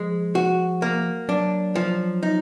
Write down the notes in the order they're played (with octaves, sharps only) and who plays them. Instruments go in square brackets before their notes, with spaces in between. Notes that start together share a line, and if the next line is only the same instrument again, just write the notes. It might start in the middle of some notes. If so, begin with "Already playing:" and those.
Already playing: [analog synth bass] F3 [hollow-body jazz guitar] G#3
[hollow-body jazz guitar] F#4
A#3
[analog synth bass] F#3 [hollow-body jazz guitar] D4
[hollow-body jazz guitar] F3
D#4